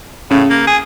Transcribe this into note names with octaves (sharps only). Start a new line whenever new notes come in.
A2 C#3
A#3
G#4